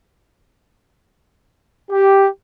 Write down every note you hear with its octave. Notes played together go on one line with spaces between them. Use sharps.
G4